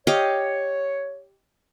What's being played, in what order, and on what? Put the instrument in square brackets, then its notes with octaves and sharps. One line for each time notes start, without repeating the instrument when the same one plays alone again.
[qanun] G4 D#5 F5 [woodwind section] C#5